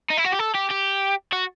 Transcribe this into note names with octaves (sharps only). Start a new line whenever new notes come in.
D#4
E4
F#4
G4
A4
G4
G4
F#4